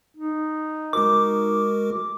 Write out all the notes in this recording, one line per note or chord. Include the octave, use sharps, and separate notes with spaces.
D#4
G#3 F#4 A#4 D6